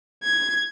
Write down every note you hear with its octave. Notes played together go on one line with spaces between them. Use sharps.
G#6